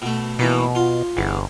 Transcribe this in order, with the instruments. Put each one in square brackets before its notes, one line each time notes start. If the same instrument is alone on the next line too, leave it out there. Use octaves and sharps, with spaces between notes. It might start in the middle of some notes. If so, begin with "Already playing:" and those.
[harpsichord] B2 A3
[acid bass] B2 [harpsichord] E3 A#3 D#4
[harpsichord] F4
[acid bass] G1 [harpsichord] E2